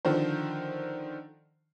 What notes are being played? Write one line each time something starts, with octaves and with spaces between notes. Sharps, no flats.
D3 D#3 F3 C5